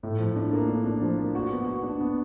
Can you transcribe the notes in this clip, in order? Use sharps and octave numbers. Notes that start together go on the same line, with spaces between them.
A2
F3
D4
A#3
D4
D4
F3
A#3
F#4
B3
F#4
D4
B3